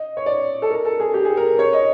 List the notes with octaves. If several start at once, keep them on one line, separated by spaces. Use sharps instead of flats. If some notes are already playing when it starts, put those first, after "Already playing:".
Already playing: D#5
C#5
D5
A4
A#4
A4
G#4
G4
G#4
A#4
C#5
D#5